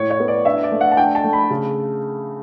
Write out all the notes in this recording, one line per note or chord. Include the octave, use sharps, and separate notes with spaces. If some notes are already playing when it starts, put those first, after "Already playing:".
Already playing: A2 C#5
C#5
B3
D5
D4 E5
D5
A3
F#5
A5
D4 G5
A5
A3
B5
C#3